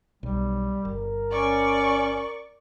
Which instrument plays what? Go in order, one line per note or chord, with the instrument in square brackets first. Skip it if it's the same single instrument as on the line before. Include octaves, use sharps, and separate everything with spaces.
[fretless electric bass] B1 [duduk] G3
[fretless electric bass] G1 [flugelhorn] A#4
[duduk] C#4 [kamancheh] D5 C#6